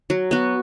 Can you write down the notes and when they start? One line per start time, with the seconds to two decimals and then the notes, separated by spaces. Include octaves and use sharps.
0.10 F#3
0.31 B3 F#4